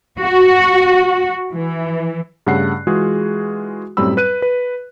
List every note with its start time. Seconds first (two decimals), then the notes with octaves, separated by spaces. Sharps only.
0.19 F#4
1.51 E3
2.47 G2 C#3 A3 F#5 F#6 C7
2.87 E3 G#3 F4 F#4 G#4
3.97 F#2 A2 G3 C4 B5 E6
4.17 B4 F#6 D#7
4.42 B4